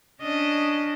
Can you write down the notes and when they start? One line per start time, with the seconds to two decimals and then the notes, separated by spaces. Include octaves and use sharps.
0.22 C#4 D4 D#5